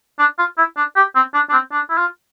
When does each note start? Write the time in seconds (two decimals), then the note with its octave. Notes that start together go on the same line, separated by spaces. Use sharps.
0.19 D4
0.39 F4
0.58 E4
0.77 D4
0.97 G4
1.16 C4
1.34 D4
1.50 D4
1.53 C4
1.72 D4
1.90 E4
1.98 F4